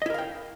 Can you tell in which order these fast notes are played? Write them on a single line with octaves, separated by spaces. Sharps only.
D#5 E4 A#4 F5 G5